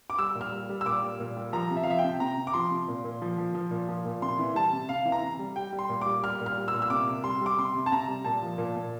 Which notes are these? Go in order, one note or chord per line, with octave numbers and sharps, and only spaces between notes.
D6
G3 E6
A#2
F6
G3
G3
E6
A#2 D6
G3
A#2
G3
F3 A#5
C3
E5
F5
F3 E5
G5
C3
C3 A#5
C3
D6
F3 C6
C3
A#2
A#2
F3
F3
F3
A#2
F3
A#2
C3 C6
E3
G3 A5
C3
C3 F5
E3
A#5
C3
G3
G3 G5
G3
C6
A#2
G3 D6
G3 F6
A#2
F6
G3
E6
A#2
E6
C3 D6
C3
G3 C6
G3 D6
C3 C6
C3
A5
C3 A#5
G3
A#2 A5
F3
A#2
A#2